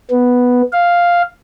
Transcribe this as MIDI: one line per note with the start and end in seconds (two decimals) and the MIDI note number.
0.10 0.62 59
0.72 1.22 77